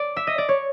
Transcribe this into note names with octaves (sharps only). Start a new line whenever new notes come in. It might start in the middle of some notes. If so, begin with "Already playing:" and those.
Already playing: D5
E5
D#5
D5
C#5